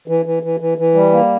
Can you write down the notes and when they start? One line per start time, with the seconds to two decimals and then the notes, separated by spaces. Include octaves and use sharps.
0.08 E3
0.25 E3
0.43 E3
0.60 E3
0.78 E3
0.94 G3
1.12 A#3